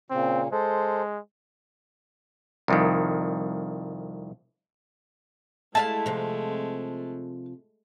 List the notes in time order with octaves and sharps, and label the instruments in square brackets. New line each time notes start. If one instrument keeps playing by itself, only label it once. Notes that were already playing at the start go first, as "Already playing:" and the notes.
[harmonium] A#2 C#3 [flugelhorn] C4
[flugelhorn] G#3 [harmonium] A4 C5
[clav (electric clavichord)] C2 F2 D#3
[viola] G#3 A3 [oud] E4 E5 F5 [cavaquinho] A5
[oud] C3 F3